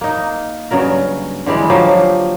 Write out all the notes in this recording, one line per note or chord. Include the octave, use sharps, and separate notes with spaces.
A#3 D#4
G2 C#3 F#3 A#4
D3 E3 G3 G#3
F3 F#3 A#3 G4